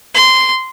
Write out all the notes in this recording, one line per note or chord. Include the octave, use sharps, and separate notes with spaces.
C6